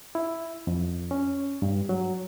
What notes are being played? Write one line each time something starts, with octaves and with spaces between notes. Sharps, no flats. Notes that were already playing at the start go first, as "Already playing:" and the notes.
E4
F2
C#4
G2
F#3